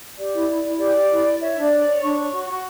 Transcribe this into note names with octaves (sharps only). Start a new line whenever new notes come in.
G4 D5
E4
E4
E4
G4 D5
G4
E4
E4
C#5 E5
E5
D4 D5
C#5
C#5
D4 C#6
C#5
F#4
F#4